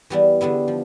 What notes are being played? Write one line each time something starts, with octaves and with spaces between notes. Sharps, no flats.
E3 G3 B3 E4
D3 G3 B3 E4
F3